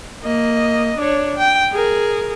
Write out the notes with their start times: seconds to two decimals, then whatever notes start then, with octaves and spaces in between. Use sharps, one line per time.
0.23 A#3 D#5
0.98 D4 C#5
1.38 G5
1.72 G#4 A#4